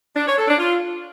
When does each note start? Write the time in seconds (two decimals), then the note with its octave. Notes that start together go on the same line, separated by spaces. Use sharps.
0.16 D4
0.27 C#5
0.37 A4
0.48 D4
0.58 F4